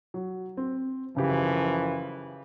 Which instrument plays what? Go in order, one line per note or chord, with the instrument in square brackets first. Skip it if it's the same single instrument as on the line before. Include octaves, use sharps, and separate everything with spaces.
[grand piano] F#3
C4
[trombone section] F#2 E3 F3 [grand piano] C#3 G4